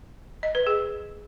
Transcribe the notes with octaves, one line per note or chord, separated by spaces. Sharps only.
D#5
B4
G#4